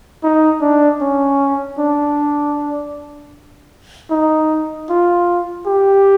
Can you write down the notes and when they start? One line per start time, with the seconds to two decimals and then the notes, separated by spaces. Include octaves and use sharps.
0.23 D#4
0.62 D4
1.01 C#4
1.79 D4
4.11 D#4
4.90 F4
5.67 G4